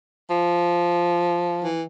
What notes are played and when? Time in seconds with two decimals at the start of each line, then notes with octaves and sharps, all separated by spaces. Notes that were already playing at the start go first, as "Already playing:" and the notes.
0.31 F3
1.63 E3